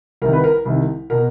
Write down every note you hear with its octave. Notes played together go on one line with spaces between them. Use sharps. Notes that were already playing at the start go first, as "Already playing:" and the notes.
C2 C3 D#3 A#4
B4
A#4
C2 C3 D#3
B2 A#4